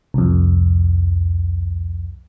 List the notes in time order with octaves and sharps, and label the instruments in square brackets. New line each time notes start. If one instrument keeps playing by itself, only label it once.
[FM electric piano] C2 F2